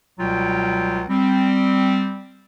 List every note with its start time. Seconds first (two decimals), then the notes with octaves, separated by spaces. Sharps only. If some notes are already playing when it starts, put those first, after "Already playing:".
0.19 C#2 B2 F#3 G3 F4 G5
1.09 G3 C4